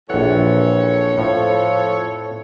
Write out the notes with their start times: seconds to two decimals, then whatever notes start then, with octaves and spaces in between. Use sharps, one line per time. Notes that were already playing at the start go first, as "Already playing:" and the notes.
0.10 A#1 F2 E3 A4 C#5 F#5
1.18 A2 F3